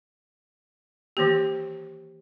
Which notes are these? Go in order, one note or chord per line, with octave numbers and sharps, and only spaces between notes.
D#3 E3 A#3 G4